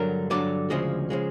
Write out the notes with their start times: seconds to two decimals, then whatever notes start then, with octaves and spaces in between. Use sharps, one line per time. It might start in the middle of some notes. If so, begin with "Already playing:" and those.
Already playing: G2 D3 F#3 A#4
0.30 G2 D3 F#3 D5
0.70 D2 C#3 F3 G#3 D#5
1.10 C#3 F3 G#3